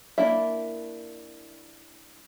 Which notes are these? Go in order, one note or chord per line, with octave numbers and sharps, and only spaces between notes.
A#3 D4 E4 E5